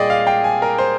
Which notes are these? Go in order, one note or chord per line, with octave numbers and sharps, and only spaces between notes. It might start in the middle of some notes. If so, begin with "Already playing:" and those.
Already playing: A#2 G3 G#4 D5 D#5 G5
F5
G5
G#5
A#4
C5